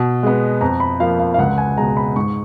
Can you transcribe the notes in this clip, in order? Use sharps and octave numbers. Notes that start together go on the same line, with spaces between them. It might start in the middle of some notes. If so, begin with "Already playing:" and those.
Already playing: B2
G#3 B3
F2 A#5
B5
F3 A#3 F5
F5
F5
C#2 F#5
G#5
B2 G#3 A#5
B5
G#2 C#6